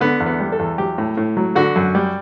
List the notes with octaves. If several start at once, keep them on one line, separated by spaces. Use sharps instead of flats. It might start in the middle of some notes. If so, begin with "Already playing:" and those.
D3 B3
E2
B3
G3
A4
E2
F#3 G4
A2
A2
F#3
D3 F#4
F#2
G3